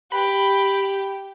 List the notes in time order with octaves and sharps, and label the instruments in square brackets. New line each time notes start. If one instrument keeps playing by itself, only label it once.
[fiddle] G4 [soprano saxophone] B5